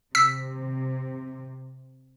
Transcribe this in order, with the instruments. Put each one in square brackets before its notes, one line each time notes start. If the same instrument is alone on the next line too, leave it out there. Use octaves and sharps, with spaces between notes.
[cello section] C3 [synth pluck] E6 B6